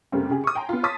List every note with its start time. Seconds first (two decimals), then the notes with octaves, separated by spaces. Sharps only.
0.12 F#2 C#3 G3 A3 A#3 C4
0.30 C#3 G4 G#4
0.44 C#6 D#6
0.55 G5 G#5 A#5 C6
0.69 B3 F4
0.83 C#5 A5 C6 D#6 A6 B6